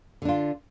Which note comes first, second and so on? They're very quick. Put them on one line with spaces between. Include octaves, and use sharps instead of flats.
D3 D4 F4